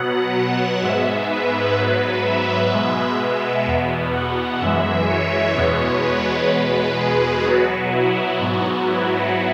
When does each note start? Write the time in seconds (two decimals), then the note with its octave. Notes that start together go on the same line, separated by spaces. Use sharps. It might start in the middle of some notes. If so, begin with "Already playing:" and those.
Already playing: B2 F#3 B3 F#5
0.82 G#2 G#3 B3 E5
1.30 B4
1.77 G#2 F#3 B3
2.24 E5
2.71 B2 G#3 B3 E5
3.19 E5
3.66 E2 B2 B3
4.13 F#5
4.60 F#2 E3 G#3 E5
5.08 C#5
5.55 E2 B2 G#3 B3
6.03 B4
6.50 E2 B2 G#3 B4
6.98 G#4
7.45 B2 F#3 B3 F#4
7.92 E4
8.39 G#2 F#3 B3 F#4
8.87 E4